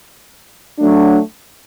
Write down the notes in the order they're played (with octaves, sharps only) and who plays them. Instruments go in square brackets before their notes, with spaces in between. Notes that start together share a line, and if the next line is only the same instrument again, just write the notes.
[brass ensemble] F#3 A3 D4